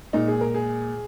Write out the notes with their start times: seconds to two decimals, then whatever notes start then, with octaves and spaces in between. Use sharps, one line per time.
0.13 A#2 G#3 D#4
0.28 G#4
0.41 A#4
0.54 G#4